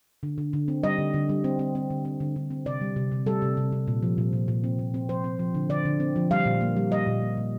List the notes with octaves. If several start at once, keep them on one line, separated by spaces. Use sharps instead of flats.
D3
D3
D3
C4
G3 D#5
D3
D3
G3
C4
C4
C4
D3
C4
D3
D3
C4
C3 D5
G3
C3
C3
G3 A4
C3
C3
C3
A#2
F3
A#2
A#2
A#2
C4
A#2
C4
F3 C5
C4
F3
D3
D3 D5
D3
C4
F3
G3 F5
A#2
A#3
G3
G3 D#5
A#2
A#2
A#2